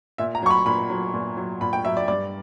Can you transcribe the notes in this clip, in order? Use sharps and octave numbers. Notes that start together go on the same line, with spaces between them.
A#2 E5
A#5
F#3 C#6
B5
A#2 B5
F#3
A#2
F#3
A#2 B5
G5
F#3 E5
D5
G2 D5